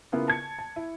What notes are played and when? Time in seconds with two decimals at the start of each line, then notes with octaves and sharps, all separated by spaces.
0.12 C#3 A#3 B3 E4 F4
0.28 A5 G#6 C#7
0.59 A5
0.76 E4